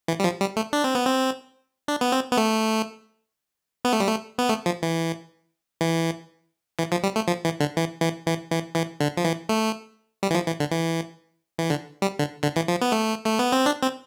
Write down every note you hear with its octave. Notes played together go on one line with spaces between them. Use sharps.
E3
G3
F3
G3
A3
D4
C4
B3
C4
D4
B3
C4
B3
A3
B3
A3
G3
A3
B3
A3
F3
E3
E3
E3
F3
G3
A3
F3
E3
D3
E3
E3
E3
E3
E3
D3
F3
E3
A3
G3
E3
F3
E3
D3
E3
E3
D3
G3
D3
D3
E3
F3
B3
A3
A3
B3
C4
D4
C4